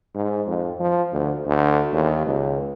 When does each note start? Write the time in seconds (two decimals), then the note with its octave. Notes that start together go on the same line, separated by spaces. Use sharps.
0.15 G#2
0.47 F2
0.79 F3
1.13 D2
1.45 D2
1.93 D#2
2.26 C#2